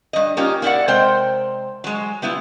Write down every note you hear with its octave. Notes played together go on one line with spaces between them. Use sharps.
G2 D#5
A#3 C#4 D#4 F4 G4
A#3 C4 E4 F4 D5 F#5
C3 G#3 A#4 C5 G5
F#3 G#3
G3 B3 E4 F4